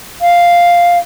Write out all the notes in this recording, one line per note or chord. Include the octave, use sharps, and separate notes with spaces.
F5